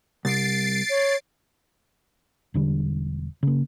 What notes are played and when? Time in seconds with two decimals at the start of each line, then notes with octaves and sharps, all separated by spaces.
0.25 C2 A6 C7 D7
0.90 C#5
2.54 E1 D3 G3
3.43 C#3 A#3